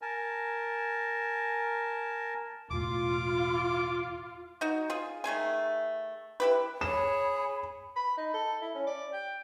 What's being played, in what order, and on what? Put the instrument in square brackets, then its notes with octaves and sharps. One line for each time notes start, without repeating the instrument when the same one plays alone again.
[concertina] A#4 G#5 A5
[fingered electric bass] E1 A2 [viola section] F4 [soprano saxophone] D6
[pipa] D#4 F#4
F4 G#4
D#3 A3 G#4 G#5
E4 G4 B4
[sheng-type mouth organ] G#4 [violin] C#5 [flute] B5 [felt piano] E7
[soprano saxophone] B5
D#4
A4
E4
C#4
D5
G5